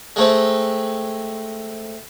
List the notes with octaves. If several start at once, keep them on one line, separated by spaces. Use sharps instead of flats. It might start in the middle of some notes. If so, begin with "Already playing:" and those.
G#3 A3 C4